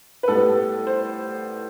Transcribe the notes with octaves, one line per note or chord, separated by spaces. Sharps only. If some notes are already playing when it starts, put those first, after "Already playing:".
B4
A2 G3 B3 A4
C5